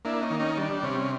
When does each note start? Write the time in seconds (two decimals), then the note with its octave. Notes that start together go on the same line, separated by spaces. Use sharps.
0.05 A#3 D4 E4
0.22 C#4 D#4
0.31 D#3
0.40 C#4 D#4
0.58 G3 D4
0.83 C3 C#4